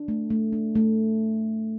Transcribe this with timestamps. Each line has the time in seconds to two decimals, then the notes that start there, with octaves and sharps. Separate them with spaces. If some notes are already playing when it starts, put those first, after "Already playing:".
Already playing: D4
0.08 A3
0.30 A3
0.53 D4
0.75 A3